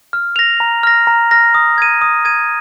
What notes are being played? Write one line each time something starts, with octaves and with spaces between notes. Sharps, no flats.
F6
A#6 F7
A#5
F6 A#6
A#5
F6 A#6
D#6
G#6 D#7
D#6
G#6 D#7